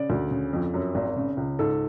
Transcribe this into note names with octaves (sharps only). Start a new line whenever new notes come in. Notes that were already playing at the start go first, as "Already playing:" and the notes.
Already playing: C#3 D5
D2
C#3
F2
F#2
G#1
C#3
C#2
G#2 A4